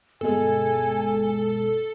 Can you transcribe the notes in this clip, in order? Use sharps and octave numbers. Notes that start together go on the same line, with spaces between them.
G1 B2 G#3 A4 G#5